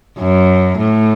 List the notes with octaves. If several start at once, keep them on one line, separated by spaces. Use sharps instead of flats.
F#2
A2